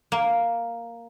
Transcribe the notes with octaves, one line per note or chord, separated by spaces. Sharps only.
A#3